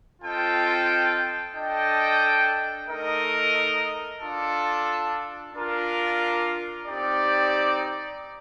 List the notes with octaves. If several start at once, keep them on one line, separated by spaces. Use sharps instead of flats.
C4 F4 A4 D#5 G5
D4 A4 D#5 G5
A3 D#4 A#4 D#5
D4 F4 A4
D4 F4 A#4 F5
C4 D#4 G4 D5